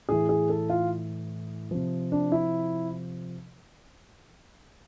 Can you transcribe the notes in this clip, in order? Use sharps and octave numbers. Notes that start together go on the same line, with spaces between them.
A2 E3 G#4
G#4
A4
F4
C3 F3
D4
E4